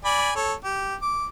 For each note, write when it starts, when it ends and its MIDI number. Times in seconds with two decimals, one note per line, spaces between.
0.05 0.31 74
0.05 0.31 80
0.05 0.31 83
0.36 0.53 69
0.36 0.53 73
0.64 0.95 67
1.02 1.26 86